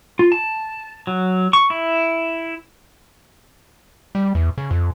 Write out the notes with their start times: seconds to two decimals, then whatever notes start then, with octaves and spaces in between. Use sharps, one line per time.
0.19 F4
0.32 A5
1.07 F#3
1.53 C#6
1.70 E4
4.15 G3
4.35 E2
4.58 C#3
4.71 F2